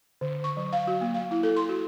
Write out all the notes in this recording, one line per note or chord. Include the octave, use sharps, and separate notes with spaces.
D3
C#6
F#3
F5
F#4
A#3
F5
E4
A4
C6
F#4